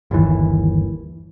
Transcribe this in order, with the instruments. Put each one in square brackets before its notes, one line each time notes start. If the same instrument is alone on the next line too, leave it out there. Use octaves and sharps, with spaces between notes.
[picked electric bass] G1 D#2 E3